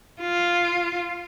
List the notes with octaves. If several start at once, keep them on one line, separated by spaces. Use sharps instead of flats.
F4